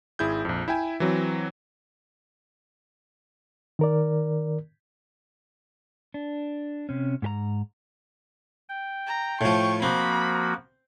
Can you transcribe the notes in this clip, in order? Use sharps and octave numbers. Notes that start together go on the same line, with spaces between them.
G#1 E4 G#4 G6
A#1 F2
E4 E5 G5 G#5
E3 F#3 C4
D#3 A#4 D5
D4
C3 C#4
G#2 G4 A#5
G5
A#5
A2 F3 C#6
F3 A#3 C4 F#4 B5